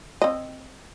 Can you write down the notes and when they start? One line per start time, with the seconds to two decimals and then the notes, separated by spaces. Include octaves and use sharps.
0.22 C4 D#5